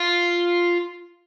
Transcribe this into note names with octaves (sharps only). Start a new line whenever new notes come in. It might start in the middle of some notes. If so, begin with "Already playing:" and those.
Already playing: F4